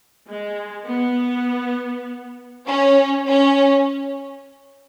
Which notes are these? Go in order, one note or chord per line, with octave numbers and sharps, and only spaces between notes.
G#3
B3
C#4
C#4